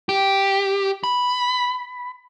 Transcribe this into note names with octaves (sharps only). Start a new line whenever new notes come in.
G4
B5